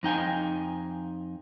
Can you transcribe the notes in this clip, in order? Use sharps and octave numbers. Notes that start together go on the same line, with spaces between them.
F2 D#4 G5 G#5